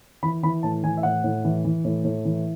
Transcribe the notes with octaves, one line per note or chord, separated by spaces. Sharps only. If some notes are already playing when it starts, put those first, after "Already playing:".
E3 B5
E3 B5
A2 A5
E3 G#5
E5
A2 F#5
A2
E3
E3
A2
A2
E3